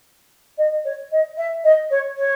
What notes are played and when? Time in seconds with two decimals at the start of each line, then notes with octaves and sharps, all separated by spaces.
0.58 D#5
0.85 C#5
1.12 D#5
1.37 E5
1.64 D#5
1.90 C#5
2.18 C#5